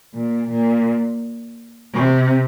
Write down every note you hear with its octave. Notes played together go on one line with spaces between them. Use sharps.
A#2
A#2
C3